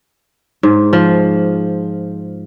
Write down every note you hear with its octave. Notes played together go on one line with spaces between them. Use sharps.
G#2
F3